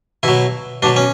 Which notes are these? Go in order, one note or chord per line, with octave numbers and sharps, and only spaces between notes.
B2 F#3 E4
B2 F#3 D4
C#4